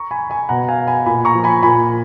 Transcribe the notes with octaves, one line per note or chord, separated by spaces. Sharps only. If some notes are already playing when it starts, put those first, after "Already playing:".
Already playing: A#5 C#6
G#5 B5
G#5 B5
B2 F#5 A#5
F5 G#5
G#5 B5
A#2 G#5 B5
A#5 C#6
F3
G#5 B5
A#2 G#5 B5